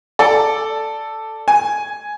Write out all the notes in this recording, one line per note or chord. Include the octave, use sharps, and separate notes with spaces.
A4 D5
G#5